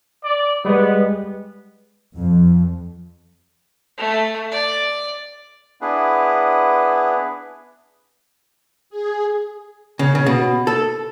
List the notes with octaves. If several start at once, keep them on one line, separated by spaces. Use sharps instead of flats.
D5
G3 G#3 B3 B4
F2
A3
D5
B3 D4 E4 G#4 B4
G#4
C#3
C#3
B2
A4